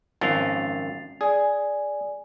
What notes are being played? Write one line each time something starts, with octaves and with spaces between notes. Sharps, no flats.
G#1 F#2 F3 A6 C7 F7
G#4 D5 G#5